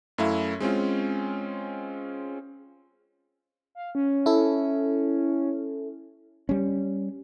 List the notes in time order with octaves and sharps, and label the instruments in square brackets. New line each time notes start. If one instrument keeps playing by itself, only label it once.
[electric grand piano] F#2 A3 E4 F5
G#3 C4 C#4 F4
[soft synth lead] F5
C#4
[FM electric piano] E4 A4
[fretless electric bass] G3 C#4